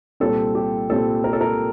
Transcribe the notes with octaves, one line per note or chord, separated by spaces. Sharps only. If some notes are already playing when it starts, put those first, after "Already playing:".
C2 A#2 G3 C4 A4
G4
C2 A#2 G3 C4 A4
A#4
A4
A#4